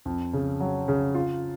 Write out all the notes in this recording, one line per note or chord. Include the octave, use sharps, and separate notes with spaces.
F2
C#3
F#3
C#3
F4